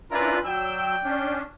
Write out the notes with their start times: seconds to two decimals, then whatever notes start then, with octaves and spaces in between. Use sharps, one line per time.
0.11 C#4 D4 E4 F4 A#4 B4
0.44 F#3 D5 G5 E6
1.04 C#4 D4